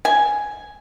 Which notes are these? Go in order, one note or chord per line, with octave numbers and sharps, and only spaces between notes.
G#5